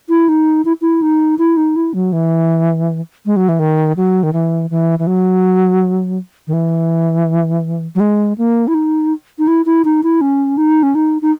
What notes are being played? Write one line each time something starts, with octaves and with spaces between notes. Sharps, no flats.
E4
D#4
E4
E4
D#4
E4
D#4
E4
F#3
E3
G#3
F#3
E3
D#3
F#3
D#3
E3
E3
E3
F#3
D#3
E3
F#3
G#3
A#3
E4
D#4
D#4
E4
E4
D#4
E4
C#4
D#4
C#4
D#4
D#4